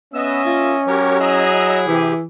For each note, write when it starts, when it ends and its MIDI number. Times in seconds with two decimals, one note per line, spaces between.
0.14 0.43 59
0.14 1.50 61
0.14 0.83 75
0.14 0.83 76
0.14 0.43 88
0.45 0.77 58
0.45 0.73 65
0.87 1.85 54
0.87 1.19 67
0.87 1.19 70
0.87 1.19 73
1.20 2.23 64
1.20 2.23 68
1.20 1.80 75
1.20 1.80 82
1.20 1.80 88
1.87 2.13 48
1.87 2.24 52
1.87 2.13 67